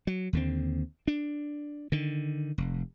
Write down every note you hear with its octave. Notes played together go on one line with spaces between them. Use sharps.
F#3
D#2 D3 C4
D4
D3 D#3
F1